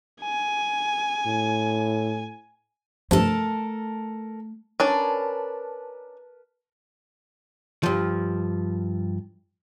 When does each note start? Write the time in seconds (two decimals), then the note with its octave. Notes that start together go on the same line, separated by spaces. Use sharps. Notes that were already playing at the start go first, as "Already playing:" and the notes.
0.22 G#5
1.26 A2
3.11 G2 C3 F3 A3 A4 A#4 A5
4.80 C#4 D4 A#4 B4 D5 A5
7.83 G2 F3